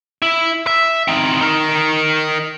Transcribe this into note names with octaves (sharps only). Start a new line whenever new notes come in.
E4
E5
C4 D#4
D#4 A#4